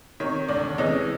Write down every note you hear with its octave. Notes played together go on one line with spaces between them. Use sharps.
C3 D#3 C#5
D2 D5
C3 E3 G#3 C#4 D#5